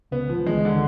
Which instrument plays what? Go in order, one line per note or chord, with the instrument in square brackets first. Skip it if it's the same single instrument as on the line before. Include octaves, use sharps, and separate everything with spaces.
[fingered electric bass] C#2 C#3 [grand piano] B3
[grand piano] F3
[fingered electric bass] C#2 C#3
[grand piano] G#3
D3